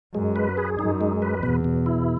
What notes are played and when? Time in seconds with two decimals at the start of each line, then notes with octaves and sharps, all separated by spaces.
0.15 F#2 G#3
0.36 B4
0.57 G#4
0.79 F#2 D#4
1.01 G#3
1.22 B4
1.43 E2 B2
1.64 B2
1.86 E4